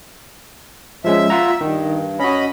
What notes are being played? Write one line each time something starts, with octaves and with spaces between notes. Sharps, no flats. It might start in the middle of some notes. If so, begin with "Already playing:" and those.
F3 G#3 C#4 E5
F4 F#5 A#5
G2 D#3
C#4 F#4 D#5 B5